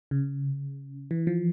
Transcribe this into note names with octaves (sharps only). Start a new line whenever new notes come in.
C#3
E3
F3